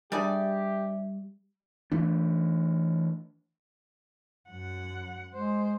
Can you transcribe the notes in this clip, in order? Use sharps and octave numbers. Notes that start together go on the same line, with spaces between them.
G3 D4 G4 G#4 D5 E5
E3 A3 D4
F#2 F#5
G#3 C5